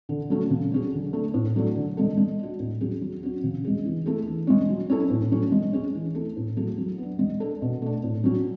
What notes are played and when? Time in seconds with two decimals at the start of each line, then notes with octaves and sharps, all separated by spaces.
0.09 D3
0.30 F#3 A3 C#4
0.50 C#3
0.72 F#3 C#4 G#4
0.93 D3
1.13 A3 D4
1.34 A2
1.56 F#3 A3 D4
1.76 D3
1.97 G#3 D4 A4
2.17 G#3
2.39 D4 F#4
2.59 A2
2.81 F#3 C#4 G#4
3.02 F#3
3.23 C#4 F#4
3.44 C#3
3.64 G#3 C#4 G#4
3.85 E3
4.06 A3 E4 G#4
4.27 E3
4.47 G#3 C#4
4.69 F#3
4.90 C#4 E4 A4
5.10 A2
5.32 F#3 A3 C#4
5.52 G#3
5.73 C#4 G#4
5.95 E3
6.15 A3 E4 A4
6.37 A2
6.56 F#3 A3 E4 G#4
6.78 F#3
6.98 B3 D4
7.19 G#3
7.40 D4 A4
7.62 B2
7.82 A3 D4
8.04 A2
8.24 F#3 C#4 F#4